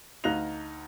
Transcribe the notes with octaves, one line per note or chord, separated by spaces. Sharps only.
D2 D#4 F5 F#6 A#6 F7